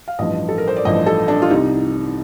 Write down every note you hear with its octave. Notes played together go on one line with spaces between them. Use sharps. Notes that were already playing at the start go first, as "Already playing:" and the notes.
F5
A1 G2 F3 D#5
A4
A#4
C5
D5
A1 G2 F3 D#5
A4
D4
F4
C2 C3 G3 D#4